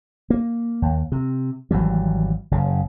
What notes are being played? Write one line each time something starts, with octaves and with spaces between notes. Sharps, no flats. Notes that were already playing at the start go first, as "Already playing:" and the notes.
A#3
D#2
C3
G#1 E3 F#3 G3
F#1 C#3